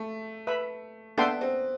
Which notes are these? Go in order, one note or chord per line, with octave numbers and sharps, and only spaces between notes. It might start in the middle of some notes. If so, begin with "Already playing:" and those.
Already playing: A3
B4 E5 B5
B3 D4 A4 E5 G5 C6
C4